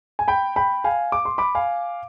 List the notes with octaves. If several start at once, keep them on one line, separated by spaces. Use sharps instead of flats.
G#5
G5 B5
G5 B5
F5 G#5
D6
C6
B5 D6
F5 G#5